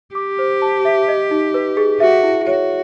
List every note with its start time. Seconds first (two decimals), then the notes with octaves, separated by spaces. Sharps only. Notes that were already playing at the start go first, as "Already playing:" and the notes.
0.15 G4 D6
0.39 C5
0.62 A5
0.85 E5
1.08 D#5
1.31 D#4
1.54 B4
1.77 G#4
2.00 F#4 E5
2.23 E4
2.47 F#4 C#5